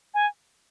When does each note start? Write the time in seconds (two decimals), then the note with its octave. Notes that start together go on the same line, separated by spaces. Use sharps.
0.14 G#5